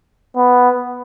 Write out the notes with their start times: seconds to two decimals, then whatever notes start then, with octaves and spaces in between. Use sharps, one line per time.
0.37 B3